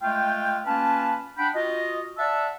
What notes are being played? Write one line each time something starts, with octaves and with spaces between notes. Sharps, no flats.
G#3 A3 F4 G5
A#3 C#4 F4 B4 A5
D4 F#5 G5 B5
F4 F#4 D#5
D5 E5 F#5 A5 E6